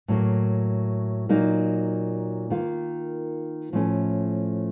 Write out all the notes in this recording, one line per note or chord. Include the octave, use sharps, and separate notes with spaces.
A2 F#3 A#3
A#2 F#3 A#3 D#4
D#3 A#3 F4
A2 F3 A3 C#4